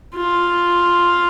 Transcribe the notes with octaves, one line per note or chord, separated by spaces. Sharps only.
F4